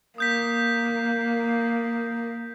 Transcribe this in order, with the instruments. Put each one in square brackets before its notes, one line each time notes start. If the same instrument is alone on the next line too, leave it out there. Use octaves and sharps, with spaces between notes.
[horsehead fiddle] A#3 [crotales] D#6 G6 B6